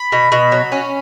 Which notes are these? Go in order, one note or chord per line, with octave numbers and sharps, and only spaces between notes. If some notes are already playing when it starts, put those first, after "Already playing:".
Already playing: B5
B2
B2
F#3
C#4